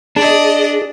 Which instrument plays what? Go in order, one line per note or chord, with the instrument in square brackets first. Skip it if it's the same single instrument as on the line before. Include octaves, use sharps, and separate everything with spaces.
[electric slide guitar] D4 [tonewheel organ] G#4 [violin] D5 D#5